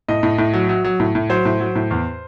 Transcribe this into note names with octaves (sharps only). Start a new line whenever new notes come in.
A2 D#5
A2
A2
F#3
F#3
F#3
A2
A2
F#3 C5
A2
F#3
A2
E2